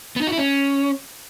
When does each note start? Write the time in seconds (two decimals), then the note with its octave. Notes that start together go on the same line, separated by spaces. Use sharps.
0.16 B3
0.22 D#4
0.27 F#4
0.32 E4
0.38 C#4